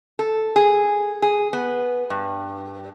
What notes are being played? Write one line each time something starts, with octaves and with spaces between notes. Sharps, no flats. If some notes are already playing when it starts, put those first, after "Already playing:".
A4
G#4
G#4
B3
G2